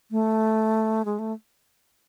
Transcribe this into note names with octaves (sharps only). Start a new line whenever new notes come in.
A3
G#3
A3